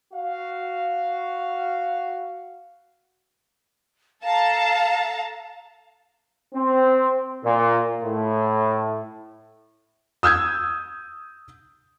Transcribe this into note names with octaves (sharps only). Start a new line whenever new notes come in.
F#4 F5
A4 F5 A5 A#5
C4
A#2
A2
D#6 E6 G6 G#6